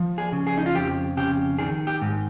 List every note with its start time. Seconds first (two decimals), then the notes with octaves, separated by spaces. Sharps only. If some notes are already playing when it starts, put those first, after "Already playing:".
Already playing: F3
0.18 G#4
0.32 C#3
0.47 G#4
0.58 D#4
0.66 F4
0.75 F2 G4
1.17 C#3 G4
1.59 D#3 G#4
1.87 G4
2.02 G#2